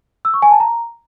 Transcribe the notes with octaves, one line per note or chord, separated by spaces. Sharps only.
E6
C#6
G#5
A5
A#5